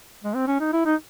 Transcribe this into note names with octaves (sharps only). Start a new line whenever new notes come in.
G#3
C4
C#4
D#4
E4
D#4